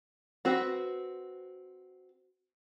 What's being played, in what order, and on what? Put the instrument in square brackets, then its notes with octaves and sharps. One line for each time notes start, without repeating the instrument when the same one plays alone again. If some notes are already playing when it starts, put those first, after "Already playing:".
[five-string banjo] C4 F#4 B4